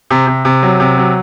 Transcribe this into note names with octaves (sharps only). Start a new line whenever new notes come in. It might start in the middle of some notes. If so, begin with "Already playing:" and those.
C3
C3
C3
F#3
C3
F#3